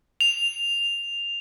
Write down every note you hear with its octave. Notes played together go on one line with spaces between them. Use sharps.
F7